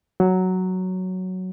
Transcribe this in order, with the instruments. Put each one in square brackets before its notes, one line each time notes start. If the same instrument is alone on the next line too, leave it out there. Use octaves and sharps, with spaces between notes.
[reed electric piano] F#3